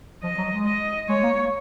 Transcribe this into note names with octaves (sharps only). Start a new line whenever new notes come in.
F3 D#5
F#3
G#3
D#5
G#3 C#5
A#3